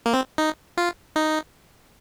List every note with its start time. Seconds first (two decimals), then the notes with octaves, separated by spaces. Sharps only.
0.06 A#3
0.13 C4
0.38 D#4
0.77 F4
1.16 D#4